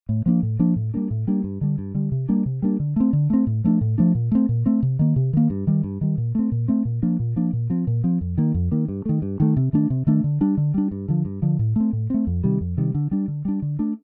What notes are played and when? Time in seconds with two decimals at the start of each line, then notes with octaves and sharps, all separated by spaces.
0.09 A2
0.26 F3 A#3 D4
0.43 A2
0.59 F3 A#3 D4
0.76 A2
0.94 G3 A#3 D4
1.11 A2
1.27 G3 A#3 D4
1.44 G2
1.61 D3 G3
1.78 G2
1.95 D3 G3
2.12 C3
2.29 G3 A#3 D4
2.46 C3
2.62 G3 A#3 D4
2.80 D3
2.96 A3 C4
3.13 D3
3.30 A3 C4
3.47 A2
3.64 F3 A3 D4
3.81 A2
3.98 F3 A3 D4
4.15 A#2
4.32 A3 C4
4.49 A#2
4.66 A3 C4
4.83 C3
4.99 D#3 A#3
5.16 C3
5.33 D#3 A#3
5.50 G2
5.67 D#3 G3
5.84 G2
6.01 D#3 G3
6.18 A#2
6.35 A3 C4
6.52 A#2
6.68 A3 C4
6.85 A#2
7.03 F3 A#3 D4
7.19 A#2
7.36 F3 A#3 D4
7.53 A#2
7.70 F3 C4
7.87 A#2
8.04 F3 C4
8.21 F2
8.38 D#3 A#3
8.54 F2
8.72 D#3 A#3
8.88 G2
9.05 D#3 A3
9.22 G2
9.40 D#3 A3
9.57 C3
9.73 D#3 A3 D4
9.90 C3
10.07 D#3 A3 D4
10.24 D3
10.41 G3 D4
10.57 D3
10.74 G3 D4
10.91 G2
11.08 D3 F3
11.25 G2
11.42 D3 F3
11.59 A2
11.76 A3 C4
11.93 A2
12.10 A3 C4
12.27 F2
12.44 C3 D#3 G3
12.61 F2
12.77 C3 D#3 G3
12.95 D3
13.11 G3 D4
13.28 D3
13.45 G3 D4
13.62 D3
13.79 A3 D4